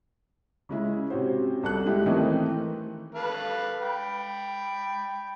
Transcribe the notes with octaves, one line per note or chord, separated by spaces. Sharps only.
C#3 G#3 E4
C3 C#4 F#4 C5
C2 A4 F#6
G#3 D#4 E4 G4
D#3 E3 A3 C4 D#4
A4 B4 F5
G5 B5